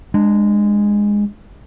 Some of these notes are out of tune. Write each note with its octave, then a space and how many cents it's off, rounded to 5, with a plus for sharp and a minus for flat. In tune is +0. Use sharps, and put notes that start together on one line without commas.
G#3 -10 D4 +20